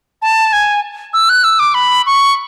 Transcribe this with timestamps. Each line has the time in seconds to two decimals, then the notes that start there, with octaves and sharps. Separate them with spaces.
0.22 A5
0.53 G#5
1.13 E6
1.29 F#6
1.44 E6
1.59 D6
1.74 B5
2.06 C#6